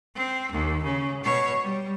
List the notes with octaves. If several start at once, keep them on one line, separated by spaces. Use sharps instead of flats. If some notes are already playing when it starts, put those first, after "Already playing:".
C4
D#2
C#3
B2 C#5
G3